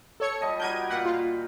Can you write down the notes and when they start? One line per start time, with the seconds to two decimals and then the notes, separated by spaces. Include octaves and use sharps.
0.20 A4 C#5 C#7
0.41 G3 D#5 A5
0.60 G3 F#4 A#4 G6 G#6 D#7
0.90 A#2 F#5 G5 B5
1.05 F4